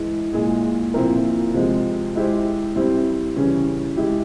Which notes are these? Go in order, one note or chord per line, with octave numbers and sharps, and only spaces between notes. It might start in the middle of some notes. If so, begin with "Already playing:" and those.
Already playing: E3 G#3 E4
A#2 G#3 E4 G#4
A#2 F3 C4 E4 A#4
C3 F3 G#3
G#3 E4 G4 C5
G3 C4 E4
C#3 E3 G3 C#4
G#3 E4 G4